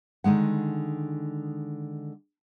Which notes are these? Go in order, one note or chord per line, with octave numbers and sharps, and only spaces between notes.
D3 D#3 G#3 F#5